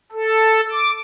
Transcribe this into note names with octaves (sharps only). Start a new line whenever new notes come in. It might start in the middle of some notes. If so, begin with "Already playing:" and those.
A4
D6